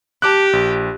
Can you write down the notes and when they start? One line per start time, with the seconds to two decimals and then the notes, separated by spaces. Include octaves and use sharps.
0.22 G4 A5 D6 F#6
0.53 A#1